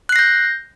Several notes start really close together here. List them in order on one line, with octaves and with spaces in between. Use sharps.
F#6 C7 A#6 G6